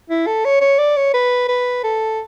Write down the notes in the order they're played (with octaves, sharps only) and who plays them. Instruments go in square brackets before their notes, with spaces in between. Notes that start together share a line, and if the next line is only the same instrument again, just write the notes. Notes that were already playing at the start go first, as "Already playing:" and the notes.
[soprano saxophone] E4
A4
C#5
C#5
D5
C#5
B4
B4
A4